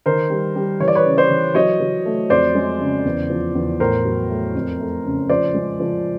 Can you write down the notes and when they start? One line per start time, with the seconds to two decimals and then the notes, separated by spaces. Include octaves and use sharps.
0.06 D#3 A#4 C5
0.30 G3
0.56 G3
0.80 E3 C#5
0.88 D5
0.95 B4 C#5
1.05 C#3
1.18 C5 D5
1.30 E3
1.55 F#3 C#5 D#5
1.80 F#3
2.06 A3
2.30 F2 C5 D5
2.55 G#3
2.80 C#3
3.05 E2
3.30 F3
3.55 E2
3.80 A2 A#4 C5
4.05 F#3
4.30 A3
4.55 F2
4.79 A3
5.05 C#3
5.30 F3 C5 D5
5.54 G#3
5.80 F3